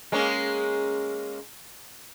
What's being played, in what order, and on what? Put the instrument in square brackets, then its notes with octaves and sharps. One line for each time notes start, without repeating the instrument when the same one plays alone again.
[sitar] G#3 A#3 C#4